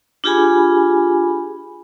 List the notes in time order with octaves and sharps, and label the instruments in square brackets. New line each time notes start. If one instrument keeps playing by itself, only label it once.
[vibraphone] D4 F4 G4 G#4 G#5 B5